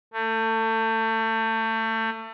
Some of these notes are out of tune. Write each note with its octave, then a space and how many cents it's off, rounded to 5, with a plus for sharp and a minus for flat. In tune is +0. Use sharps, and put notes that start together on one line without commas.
A3 +30